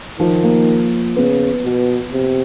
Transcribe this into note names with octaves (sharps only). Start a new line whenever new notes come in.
D#3 F3
A#3
C#3 B3
B2
C3